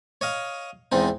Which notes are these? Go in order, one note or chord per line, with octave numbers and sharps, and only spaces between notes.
C#5 D#5 F5
E2 G#2 C4 D#4